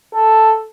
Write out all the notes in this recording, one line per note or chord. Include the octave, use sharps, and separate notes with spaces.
A4